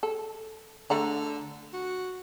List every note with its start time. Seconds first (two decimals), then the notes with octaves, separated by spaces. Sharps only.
0.03 A4
0.90 D3 A3 F#5 A#5
1.74 F#4